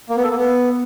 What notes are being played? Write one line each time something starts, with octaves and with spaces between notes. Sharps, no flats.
A#3
B3
A4
A#3
B3